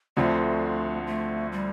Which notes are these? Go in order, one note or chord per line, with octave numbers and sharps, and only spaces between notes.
D2 D3 F3 A3 C4
A3
G3